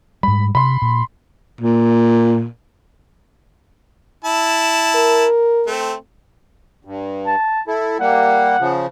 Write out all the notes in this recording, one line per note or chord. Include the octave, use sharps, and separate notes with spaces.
G#2 G3 B5
C3 B5 C6
A#2
A#2
E4 A5
A#4
A3 C4
G2
A5
E4 A4
G3 A#3 F#5
C#3 F3